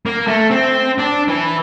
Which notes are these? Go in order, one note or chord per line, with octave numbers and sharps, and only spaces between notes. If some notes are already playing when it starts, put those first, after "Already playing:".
A#3
A3
C4
D4
E3